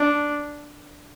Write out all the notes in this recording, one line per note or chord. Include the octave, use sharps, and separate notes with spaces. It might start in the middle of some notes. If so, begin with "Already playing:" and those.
Already playing: D4